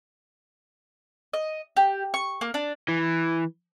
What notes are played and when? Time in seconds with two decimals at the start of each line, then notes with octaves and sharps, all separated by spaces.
1.33 D#5
1.76 G4
2.14 C#6
2.41 A#3
2.54 D4
2.88 E3